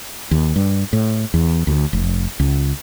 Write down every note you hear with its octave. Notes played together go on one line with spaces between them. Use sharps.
D#2
G2
A2
E2
D2
F1
C#2